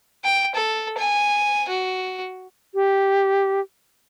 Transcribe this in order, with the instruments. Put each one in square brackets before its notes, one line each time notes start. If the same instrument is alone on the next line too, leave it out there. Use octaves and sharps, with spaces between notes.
[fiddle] G5
A4
G#5
F#4
[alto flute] G4